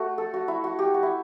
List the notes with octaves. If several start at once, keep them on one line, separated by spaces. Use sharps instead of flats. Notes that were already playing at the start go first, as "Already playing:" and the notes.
Already playing: A3 F#4
A4
F#4
E4
F#4
G4
F#4
E4